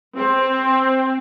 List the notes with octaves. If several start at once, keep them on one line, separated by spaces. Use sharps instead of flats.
C4